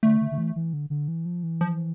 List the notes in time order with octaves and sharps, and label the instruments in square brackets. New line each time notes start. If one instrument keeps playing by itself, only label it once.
[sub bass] D3 [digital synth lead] A3
[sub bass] D3
D3
E3
E3
D3
D3
E3
F3
E3
[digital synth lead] F3